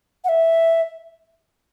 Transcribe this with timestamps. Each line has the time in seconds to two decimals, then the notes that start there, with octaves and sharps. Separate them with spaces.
0.24 F#5
0.29 E5